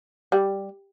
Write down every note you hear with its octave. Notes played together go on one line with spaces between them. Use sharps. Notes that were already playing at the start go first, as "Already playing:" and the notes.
G3